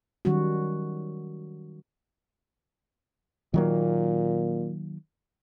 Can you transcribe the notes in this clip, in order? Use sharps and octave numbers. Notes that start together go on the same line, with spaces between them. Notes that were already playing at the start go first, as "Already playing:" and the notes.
D#3 F#3 G3 C#4 F#4
A#2 D#3 F#3 A#3